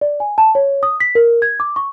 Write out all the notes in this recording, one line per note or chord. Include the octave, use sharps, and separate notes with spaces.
D5
G#5
A5
C#5
D#6
B6
A#4
G#6
D6
C#6